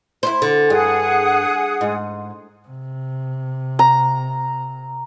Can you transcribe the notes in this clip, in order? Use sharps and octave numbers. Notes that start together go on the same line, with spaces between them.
E4 C5
D3
G2 G#4 F#5 D#6
G#2
C3
A#5